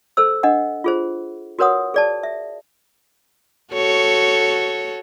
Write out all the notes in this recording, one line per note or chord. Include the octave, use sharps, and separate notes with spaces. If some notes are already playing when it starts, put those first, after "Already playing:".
A4 C5 E6
D4 D#5 F#5
F4 G#4 C5
F#4 A#4 B4 C#5 F#5 D#6
G#4 D5 A5
E5
F#4 A4 C#5